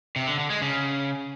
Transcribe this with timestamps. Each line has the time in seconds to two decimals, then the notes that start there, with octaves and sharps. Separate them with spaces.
0.16 C3
0.27 D3
0.39 D3
0.50 G#3
0.62 C#3